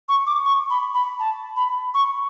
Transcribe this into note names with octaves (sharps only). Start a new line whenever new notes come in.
C#6
D6
C#6
B5
B5
A5
B5
C#6